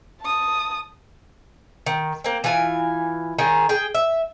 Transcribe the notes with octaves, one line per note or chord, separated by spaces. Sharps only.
A5 D#6
D#3
A#3 C4
E3 E4 F4 G#5
D#3 C#4 D#4 G#4
G#4 G5
E5